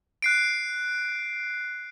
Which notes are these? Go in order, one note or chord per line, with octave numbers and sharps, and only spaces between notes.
F#6 C7 D7